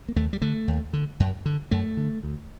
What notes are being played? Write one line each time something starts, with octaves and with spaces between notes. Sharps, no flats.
A#3
D#2 A3
G3
D3 A3
D#2
D3
F#2
D3
F#2 A3
D3
D2